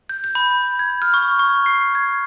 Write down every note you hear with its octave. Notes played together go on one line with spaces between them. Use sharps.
G6
G6
B5
G#6
F6
C#6
C#6
C7
G#6